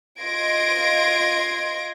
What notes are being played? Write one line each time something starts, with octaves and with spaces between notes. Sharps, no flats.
F4 D#5 C6 G#6 A#6 D7